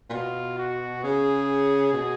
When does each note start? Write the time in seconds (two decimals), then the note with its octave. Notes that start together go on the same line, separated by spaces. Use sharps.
0.10 A#2
0.13 B2 F4
0.58 F#4
1.04 C#3 G#4
1.94 B2